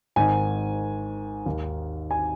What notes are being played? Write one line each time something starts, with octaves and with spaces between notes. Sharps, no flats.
G#1 G#2 D#3 G#5
D#2 D#3
G#5